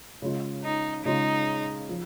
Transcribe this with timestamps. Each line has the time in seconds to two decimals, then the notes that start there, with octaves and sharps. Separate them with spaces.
0.22 C#3 G#3 F4
0.64 D#4
1.05 C#3 G#3 D#4 F4
1.89 F3